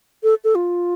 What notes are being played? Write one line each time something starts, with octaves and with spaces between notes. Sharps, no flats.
A4
A4
F4